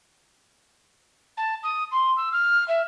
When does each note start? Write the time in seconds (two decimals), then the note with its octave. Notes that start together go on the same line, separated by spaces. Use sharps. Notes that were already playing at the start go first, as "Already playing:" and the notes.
1.37 A5
1.63 D#6
1.91 C6
2.16 E6
2.32 F6
2.68 E5